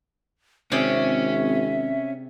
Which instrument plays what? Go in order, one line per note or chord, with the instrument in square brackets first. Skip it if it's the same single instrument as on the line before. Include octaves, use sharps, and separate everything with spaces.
[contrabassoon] G#1 [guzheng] C3 G#4 D5 [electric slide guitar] C#4 [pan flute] E5